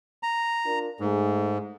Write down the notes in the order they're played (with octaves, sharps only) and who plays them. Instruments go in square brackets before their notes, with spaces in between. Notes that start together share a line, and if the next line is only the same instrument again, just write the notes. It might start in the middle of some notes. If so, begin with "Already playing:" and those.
[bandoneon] A#5
[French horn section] D4 F4 A#4
[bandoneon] G#2 [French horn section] A3 G#4